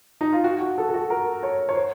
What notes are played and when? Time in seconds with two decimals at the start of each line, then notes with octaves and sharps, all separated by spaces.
0.21 D#4
0.33 F4
0.44 F#4
0.61 F#4
0.78 A4
0.89 A4
0.94 F#4
1.10 A#4
1.43 C#5
1.69 C#5
1.75 C5